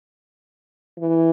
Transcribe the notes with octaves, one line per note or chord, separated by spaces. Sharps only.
E3